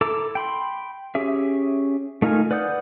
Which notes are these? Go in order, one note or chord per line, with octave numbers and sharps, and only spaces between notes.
E4 A4 A5 A#5 D6
G5 B5 C6
C#4 G4 G#4 E5
A3 D#4 F4 A#4 G#5
B4 D5 F#5 D#6 G6